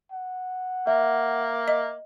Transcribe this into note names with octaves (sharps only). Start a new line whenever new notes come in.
F#5
A#3 E5
D#5